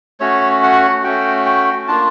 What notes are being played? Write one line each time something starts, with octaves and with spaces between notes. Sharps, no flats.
A3 C#4 F#4 C#5
F#5
A3 C#4 F#4 G5
G5
A#3 D4 F4 A5